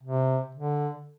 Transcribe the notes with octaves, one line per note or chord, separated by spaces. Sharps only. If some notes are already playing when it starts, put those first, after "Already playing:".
C3
D3